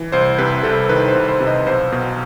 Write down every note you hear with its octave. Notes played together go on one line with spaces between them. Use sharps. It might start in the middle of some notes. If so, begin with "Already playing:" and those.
Already playing: E3
C2 C5
C3 B4
C2 A4
D#3 B4
C5
C2
C5
C3
D#5
B1 C5
B2